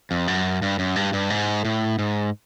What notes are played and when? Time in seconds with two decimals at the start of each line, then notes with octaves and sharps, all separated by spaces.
0.11 F2
0.28 F#2
0.62 G2
0.79 F#2
0.96 G2
1.13 G2
1.30 G#2
1.65 A2
1.99 G#2